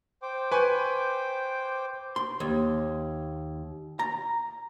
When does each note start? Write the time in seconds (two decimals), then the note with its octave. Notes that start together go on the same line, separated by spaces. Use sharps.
0.22 C5 G5 D6
0.52 B4 G#5 C#6
2.16 C6
2.40 D#2
3.99 A#5